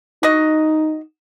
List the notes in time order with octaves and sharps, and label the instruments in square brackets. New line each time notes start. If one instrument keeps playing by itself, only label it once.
[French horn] D#4 [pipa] F#4 D#5